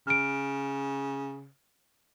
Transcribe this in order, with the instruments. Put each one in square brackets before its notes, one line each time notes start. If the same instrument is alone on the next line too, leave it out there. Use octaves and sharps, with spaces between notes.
[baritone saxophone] C#3 [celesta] F6 D7